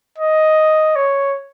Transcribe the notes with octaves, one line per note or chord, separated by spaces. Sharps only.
D#5
C#5